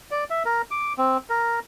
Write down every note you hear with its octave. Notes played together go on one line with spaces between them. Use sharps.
D5
E5
A#4
D6
C4
A#4